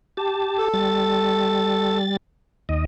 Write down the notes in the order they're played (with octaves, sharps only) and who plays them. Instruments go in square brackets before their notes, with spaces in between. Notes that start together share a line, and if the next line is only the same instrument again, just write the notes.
[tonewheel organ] G4 A5
[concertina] A4
[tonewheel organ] G3 A6
D#2 D#5